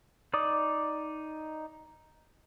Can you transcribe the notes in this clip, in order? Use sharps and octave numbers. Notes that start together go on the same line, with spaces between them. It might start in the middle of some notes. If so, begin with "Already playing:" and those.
D#4 D5 D6 D#6